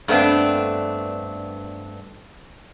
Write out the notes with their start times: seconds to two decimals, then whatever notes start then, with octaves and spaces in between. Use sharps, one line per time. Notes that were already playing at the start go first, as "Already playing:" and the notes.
0.08 G2 A3 B3 C4 D4